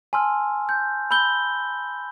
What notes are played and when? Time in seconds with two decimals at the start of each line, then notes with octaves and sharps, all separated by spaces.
0.13 G#5 A5 C6 E6 F6
0.69 G6
1.11 B5 E6 G6 G7